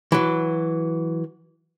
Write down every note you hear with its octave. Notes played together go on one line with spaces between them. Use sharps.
E3 F#3